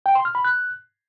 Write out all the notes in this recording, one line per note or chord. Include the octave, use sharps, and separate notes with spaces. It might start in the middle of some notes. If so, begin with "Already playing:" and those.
G5
C6
F6
B5
F#6